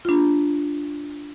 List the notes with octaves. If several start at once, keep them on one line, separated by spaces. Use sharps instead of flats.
D4 F4